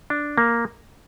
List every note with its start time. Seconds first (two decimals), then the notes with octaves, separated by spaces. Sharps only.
0.10 D4
0.38 A#3